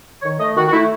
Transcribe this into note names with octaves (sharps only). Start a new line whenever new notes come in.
D#3 C#5
A3 D#5
D#3 F#4
F#4
A3 E4